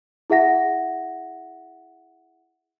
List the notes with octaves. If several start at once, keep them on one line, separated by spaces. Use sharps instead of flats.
E4 G#4 E5 F#5 A#6